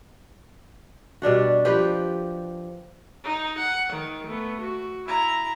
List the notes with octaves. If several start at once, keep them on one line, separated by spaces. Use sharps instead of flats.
B2 G3 D4 F#4
F3 G4 B4
D#4
F#5
D#3
A3 B3
F#4
E4 A#5